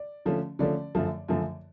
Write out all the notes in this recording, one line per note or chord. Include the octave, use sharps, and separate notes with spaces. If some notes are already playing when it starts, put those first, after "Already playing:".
Already playing: D5
D3 F3 A3 C#4
D3 F3 A3 C#4 D5
F#2 D3 F3 A3
F#2 D3 F3 A3